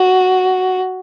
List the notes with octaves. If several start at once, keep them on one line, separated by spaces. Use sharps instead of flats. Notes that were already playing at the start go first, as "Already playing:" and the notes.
Already playing: F#4